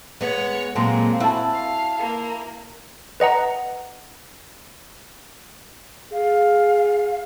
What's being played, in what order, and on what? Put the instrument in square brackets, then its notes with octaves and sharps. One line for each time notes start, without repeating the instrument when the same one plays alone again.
[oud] G#3 B3 [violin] C#5 F#5
[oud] A#2 F#3 G#3 [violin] C4 [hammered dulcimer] G#5 A#5
[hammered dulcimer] E4 A5 [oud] F#4
[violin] F5
A#3
[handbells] B4 D#5 F#5 A#5
[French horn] G#4 [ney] F5